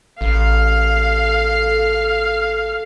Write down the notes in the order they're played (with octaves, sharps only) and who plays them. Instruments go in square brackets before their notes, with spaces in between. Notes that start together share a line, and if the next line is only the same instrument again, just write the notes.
[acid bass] A1 [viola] A4 F5